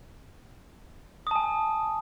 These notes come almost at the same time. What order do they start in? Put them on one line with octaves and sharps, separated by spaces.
D#6 A5 G#5